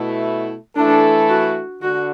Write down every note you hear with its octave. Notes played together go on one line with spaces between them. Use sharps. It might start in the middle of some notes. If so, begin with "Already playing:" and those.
Already playing: B2 A3 E4
E3 A3 D4 E4 A4
F#4
D3 F#4